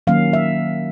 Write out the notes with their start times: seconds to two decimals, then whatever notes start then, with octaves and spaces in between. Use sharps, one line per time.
0.07 D#3 F#3 A#3 C#4 F5
0.33 E5